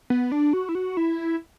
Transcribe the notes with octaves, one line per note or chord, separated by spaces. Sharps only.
B3
D4
F#4
E4
F#4
E4